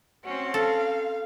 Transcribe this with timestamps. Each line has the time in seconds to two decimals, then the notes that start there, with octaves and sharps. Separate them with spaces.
0.25 C4 C#4 F#4
0.54 A4 F5